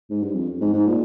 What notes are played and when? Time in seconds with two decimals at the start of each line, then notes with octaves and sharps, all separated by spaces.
0.10 G#2
0.23 G2
0.35 F2
0.61 G#2
0.73 G#2
0.87 A#2